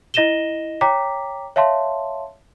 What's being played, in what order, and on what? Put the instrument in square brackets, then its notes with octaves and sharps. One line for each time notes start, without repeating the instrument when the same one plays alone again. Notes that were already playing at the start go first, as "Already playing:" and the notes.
[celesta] E4 D#5 A#6 D#7 E7 G7
C#5 G5 A#5 D6 B6
C#5 E5 F5 A5 C6